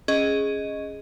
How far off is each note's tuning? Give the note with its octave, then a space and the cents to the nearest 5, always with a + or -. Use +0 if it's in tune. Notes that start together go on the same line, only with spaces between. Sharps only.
C#4 -5 G#4 +0 D#5 +0